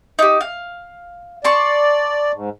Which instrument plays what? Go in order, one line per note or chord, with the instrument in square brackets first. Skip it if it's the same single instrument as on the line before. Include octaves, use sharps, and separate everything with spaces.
[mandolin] D#4 G4
F5
[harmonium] D5 [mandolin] A5 C6 C#6
[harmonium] G#2